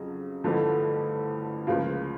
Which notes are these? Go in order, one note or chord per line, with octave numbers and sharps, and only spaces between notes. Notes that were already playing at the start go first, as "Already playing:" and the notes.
Already playing: F2 C#3 F#3
A1 G2 D3 F3 A3
C#2 C#3 F3 A#3